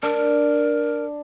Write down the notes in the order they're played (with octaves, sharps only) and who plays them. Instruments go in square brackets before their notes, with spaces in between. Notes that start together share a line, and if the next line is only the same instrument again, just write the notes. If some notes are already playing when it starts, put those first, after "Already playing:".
[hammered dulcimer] D4 [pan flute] A#4